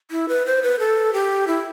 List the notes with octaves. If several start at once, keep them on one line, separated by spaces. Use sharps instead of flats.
E4
B4
C5
B4
A4
G4
E4